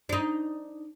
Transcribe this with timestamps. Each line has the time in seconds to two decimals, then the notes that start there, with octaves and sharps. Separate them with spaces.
0.09 D4 D#4